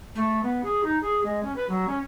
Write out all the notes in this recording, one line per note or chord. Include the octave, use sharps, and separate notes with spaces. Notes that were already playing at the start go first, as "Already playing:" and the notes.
A3
B3
G#4
D#4
G#4
G#3
C#4
B4
F#3
C#4